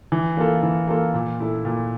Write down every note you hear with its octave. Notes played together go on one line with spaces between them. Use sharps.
E3
A#3 F4 A4
E3
A#3 F4 A4
A#2
A3 E4 A4
A#2